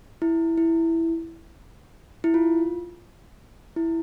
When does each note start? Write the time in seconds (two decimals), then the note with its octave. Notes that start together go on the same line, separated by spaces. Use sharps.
0.22 E4
0.58 E4
2.24 E4
2.34 F4
3.76 E4